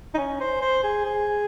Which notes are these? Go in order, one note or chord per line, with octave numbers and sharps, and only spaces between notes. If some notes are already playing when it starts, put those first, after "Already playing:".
D#4
C#4
C5
C5
G#4
G#4